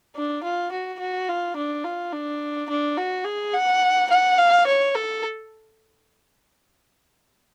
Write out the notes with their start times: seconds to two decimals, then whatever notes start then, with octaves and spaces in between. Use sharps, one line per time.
0.16 D4
0.44 F4
0.72 F#4
0.99 F#4
1.29 F4
1.56 D4
1.84 F4
2.12 D4
2.70 D4
2.98 F#4
3.25 G#4
3.54 F#5
4.10 F#5
4.38 F5
4.67 C#5
4.95 A4